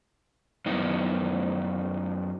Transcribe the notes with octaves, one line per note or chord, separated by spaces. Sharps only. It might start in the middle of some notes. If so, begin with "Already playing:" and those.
F#2 B3 D#4 E4